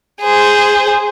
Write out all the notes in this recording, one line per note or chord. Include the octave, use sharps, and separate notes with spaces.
G#4 C5